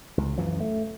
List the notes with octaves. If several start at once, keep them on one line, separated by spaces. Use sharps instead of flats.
C#2
F#2 E3 F3
A3